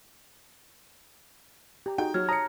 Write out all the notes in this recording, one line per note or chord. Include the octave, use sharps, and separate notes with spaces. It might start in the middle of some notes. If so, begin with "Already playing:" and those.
G4 A#5
D#4 F#4 G#4 G5
F#3 F6 G#6
C#5 A5 A#5 D#6 C#7